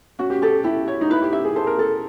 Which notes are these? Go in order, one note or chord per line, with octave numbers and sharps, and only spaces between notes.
C#4 F#4
G4
G4 A4
E4 G4
C#5
D#4
E4 B4
G4
G4 E5
G#4
A4 C5
A#4
G#4 A4